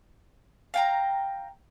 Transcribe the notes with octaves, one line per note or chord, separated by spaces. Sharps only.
F5 G5 A#5